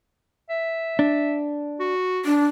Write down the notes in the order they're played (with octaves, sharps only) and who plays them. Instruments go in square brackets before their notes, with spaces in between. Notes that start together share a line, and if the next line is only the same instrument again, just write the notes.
[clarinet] E5
[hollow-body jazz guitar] D4
[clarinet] F#4
[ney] D4